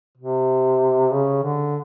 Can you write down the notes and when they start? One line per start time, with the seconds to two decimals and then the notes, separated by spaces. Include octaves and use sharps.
0.18 C3
1.13 C#3
1.44 D3